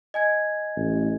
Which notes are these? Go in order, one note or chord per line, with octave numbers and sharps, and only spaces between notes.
D#5 G#5 G#6
A1